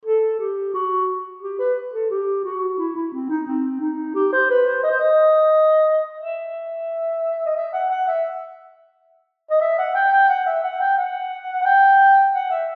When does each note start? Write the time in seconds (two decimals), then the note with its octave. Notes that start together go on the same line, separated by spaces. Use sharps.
0.05 A4
0.40 G4
0.74 F#4
1.42 G4
1.59 B4
1.93 A4
2.11 G4
2.44 F#4
2.78 E4
2.96 E4
3.13 C4
3.29 D#4
3.47 C4
3.80 D#4
4.15 G4
4.32 C5
4.49 B4
4.66 C5
4.83 D#5
4.91 C5
4.99 D#5
6.20 E5
7.46 D#5
7.56 E5
7.73 F#5
7.90 F#5
8.07 E5
9.51 D#5
9.61 E5
9.78 F#5
9.95 G5
10.12 G5
10.29 F#5
10.46 E5
10.63 F#5
10.80 G5
10.97 F#5
11.61 F#5
11.65 G5
12.34 F#5
12.51 E5